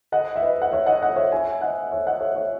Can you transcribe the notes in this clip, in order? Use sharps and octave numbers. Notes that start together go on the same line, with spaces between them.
D#5 F#5
E5
B4 D#5
F#5
C#5 E5
D#5 F#5
D#5 F#5
C#5 E5
E5 G#5
D#5 F#5
C#5 E5
D#5 F#5
C#5 E5
C#5 E5